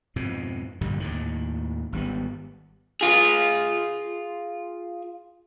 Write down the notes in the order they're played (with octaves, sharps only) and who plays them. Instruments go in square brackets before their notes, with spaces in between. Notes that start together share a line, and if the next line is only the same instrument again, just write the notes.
[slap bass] F2 G#2 B2
A#1 G2 D3 G3
D#2 A2 D#3
G#1 G3 B3
[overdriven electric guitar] F4 G#4